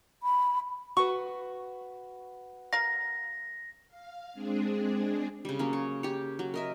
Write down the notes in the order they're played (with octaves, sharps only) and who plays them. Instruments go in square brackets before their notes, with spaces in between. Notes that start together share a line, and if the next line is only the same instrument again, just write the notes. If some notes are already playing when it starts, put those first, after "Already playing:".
[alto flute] B5
[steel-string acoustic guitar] F#4 B4 [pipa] C#6
[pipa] A#4 F5 [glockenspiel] A#6
[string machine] F5
G#3 C4 D4 G#4
[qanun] C#3 G3
F#3 A#3 C#4
C#5
G4 C#5
F#3
A#4 D#5 E5